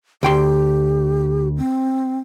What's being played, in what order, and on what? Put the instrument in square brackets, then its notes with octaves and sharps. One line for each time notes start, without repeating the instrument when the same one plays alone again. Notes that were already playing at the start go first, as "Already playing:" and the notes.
[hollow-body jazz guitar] D2 G5 C6 [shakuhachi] G4
[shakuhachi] C4